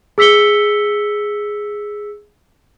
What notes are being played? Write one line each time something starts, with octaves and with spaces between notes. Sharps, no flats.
G#4 E6 B6 C#7 G7